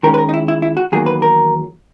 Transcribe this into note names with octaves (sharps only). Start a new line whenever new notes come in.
D#3 G#3 C#4 A#4
B4
A#4
D#4
E4
E4
E4
F#4
E2 D#3 F#3 A#3 G#4
B4
A#4